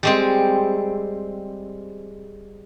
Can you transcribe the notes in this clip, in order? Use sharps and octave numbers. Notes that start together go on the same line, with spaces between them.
G3 G#3 C4